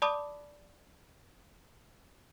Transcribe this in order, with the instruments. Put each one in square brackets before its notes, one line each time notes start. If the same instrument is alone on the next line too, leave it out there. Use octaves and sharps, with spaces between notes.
[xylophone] D5 A5 B5 D6 D#6